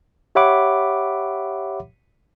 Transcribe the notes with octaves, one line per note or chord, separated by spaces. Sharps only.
G4 C#5 E5 F#5 B5 D6